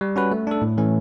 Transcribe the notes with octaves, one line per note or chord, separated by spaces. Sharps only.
G3
C#4 F#4 B4
A3
D4 A4
A2
E3 A3 C#4